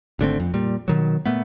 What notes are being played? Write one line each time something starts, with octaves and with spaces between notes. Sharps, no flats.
G#1 D3 A3 C4
F2
A#2 G3
B2 D#3 F#3
A#2 A3 B3